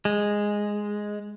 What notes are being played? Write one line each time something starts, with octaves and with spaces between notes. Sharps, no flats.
G#3